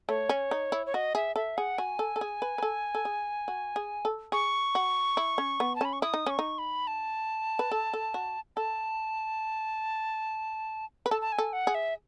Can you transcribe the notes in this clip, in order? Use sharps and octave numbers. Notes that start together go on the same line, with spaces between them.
A3 C#5
C#4
D#4
E4
C#5
F#4 D#5
G#4 E5
A4 E5
G#4 F#5
F#4 G#5
A4
A4
G#4
B4
B4
A4
A4
G#4
F#4
G#4
A4
G#4 C#6
F#4
E4
C#4
B3
A5
C#4 B5
C#6
E4 D#6
D#4
C#4 C#6
D#4
B5
A5
B4
A4
A4
F#4
A4 A5
B4
A4 A5
A5
G#5
A4
F#5
G#4
E5